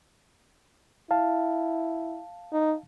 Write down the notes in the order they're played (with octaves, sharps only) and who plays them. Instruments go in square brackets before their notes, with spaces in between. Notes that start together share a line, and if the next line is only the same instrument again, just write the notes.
[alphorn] E4 [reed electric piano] F5 A5
[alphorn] D#4